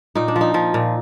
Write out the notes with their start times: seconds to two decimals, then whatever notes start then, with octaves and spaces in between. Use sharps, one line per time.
0.15 A#2 D#4
0.28 D4
0.36 F3
0.41 D#4
0.54 F3
0.74 A#2